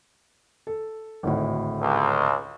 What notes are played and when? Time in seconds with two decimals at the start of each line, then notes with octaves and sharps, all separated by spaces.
0.67 A4
1.23 G#1 D2 A2
1.80 C#2